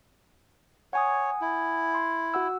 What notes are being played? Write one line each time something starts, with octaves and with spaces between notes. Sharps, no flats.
C#5 F#5 G#5 D#6
E4
C6
F#4 F#5 E6